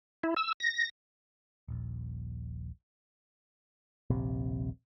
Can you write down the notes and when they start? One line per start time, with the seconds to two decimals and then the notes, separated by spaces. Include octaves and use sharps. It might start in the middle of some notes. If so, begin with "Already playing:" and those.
0.24 E4
0.36 E6
0.60 A#6
1.68 D#1 A#1
4.10 D#1 A#1 C3